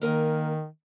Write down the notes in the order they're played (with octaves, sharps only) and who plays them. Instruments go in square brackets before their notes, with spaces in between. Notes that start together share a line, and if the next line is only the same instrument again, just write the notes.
[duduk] D#3 [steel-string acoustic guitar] A#3 A#4 G#5